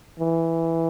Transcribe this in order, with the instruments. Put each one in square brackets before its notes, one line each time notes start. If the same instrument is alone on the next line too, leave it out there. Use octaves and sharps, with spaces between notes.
[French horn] E3